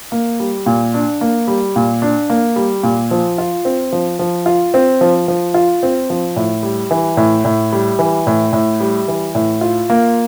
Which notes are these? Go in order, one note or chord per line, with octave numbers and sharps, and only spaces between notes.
A#3
G3
A#2
D4
A#3
G3
A#2
D4
A#3
G3
A#2
F3
F4
C4
F3
F3
F4
C4
F3
F3
F4
C4
F3
A2
G3
E3
A2
A2
G3
E3
A2
A2
G3
E3
A2
F4
A#3